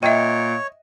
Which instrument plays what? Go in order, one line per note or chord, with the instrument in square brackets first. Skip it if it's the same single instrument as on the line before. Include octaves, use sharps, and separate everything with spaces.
[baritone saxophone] A#2 [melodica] C#5 [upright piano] D#5 [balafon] E5 G5